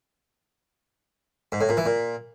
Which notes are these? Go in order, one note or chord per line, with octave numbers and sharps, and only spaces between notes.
G#2
A2
A#2
E3
A#2